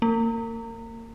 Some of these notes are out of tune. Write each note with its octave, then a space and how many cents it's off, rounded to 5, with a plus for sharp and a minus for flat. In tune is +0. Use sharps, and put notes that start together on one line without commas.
A#3 -30